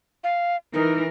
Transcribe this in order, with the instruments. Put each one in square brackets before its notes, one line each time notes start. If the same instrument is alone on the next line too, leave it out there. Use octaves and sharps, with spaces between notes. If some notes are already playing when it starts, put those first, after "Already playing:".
[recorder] F5
[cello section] E3 A#4 [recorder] D#4